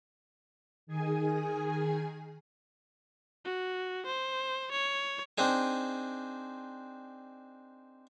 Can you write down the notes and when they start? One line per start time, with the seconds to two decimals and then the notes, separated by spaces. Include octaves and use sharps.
0.87 D#3 G#4 G#5
3.45 F#4
4.06 C5
4.72 C#5
5.38 C4 D4 D#4 G#4